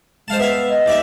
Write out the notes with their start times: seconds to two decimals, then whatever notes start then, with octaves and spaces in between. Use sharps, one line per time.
0.28 G#3 C5 F5 A5
0.40 B3 E5 F5
0.70 D#5
0.86 D#2 D5 E5